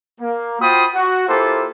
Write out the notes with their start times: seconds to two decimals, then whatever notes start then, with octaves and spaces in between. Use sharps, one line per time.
0.20 A#3
0.61 F4 F#4 C5 G5 B5 D#6
0.94 F#4
1.28 A#3 E4 F4 G4 A4 C5